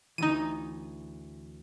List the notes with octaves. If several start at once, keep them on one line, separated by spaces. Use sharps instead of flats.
D2 E3 D#4 D#7